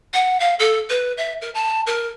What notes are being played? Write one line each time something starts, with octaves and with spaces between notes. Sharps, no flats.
F#5
F5
A4
B4
E5
A#4
A5
A#4